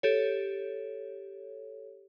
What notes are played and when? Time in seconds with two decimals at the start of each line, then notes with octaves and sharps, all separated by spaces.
0.03 G4 A4 C#5